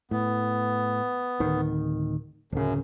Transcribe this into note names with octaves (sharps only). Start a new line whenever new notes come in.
A2 B3
D1 D#3
D1 F#2 C#3